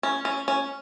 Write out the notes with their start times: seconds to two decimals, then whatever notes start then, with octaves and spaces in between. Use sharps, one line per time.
0.03 C#4
0.25 C#4
0.48 C#4